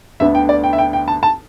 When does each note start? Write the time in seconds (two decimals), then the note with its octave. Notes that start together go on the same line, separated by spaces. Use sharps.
0.20 D2 D3 B3 D4 E5
0.35 G5
0.49 D5
0.64 G5
0.73 E5
0.78 G5
0.93 G5
1.08 A5
1.23 A5